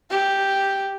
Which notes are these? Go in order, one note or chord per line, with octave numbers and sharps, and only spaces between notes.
G4